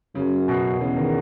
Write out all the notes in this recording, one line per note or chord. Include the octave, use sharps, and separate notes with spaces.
F#2 C#3
B2
E2 C#3
D#3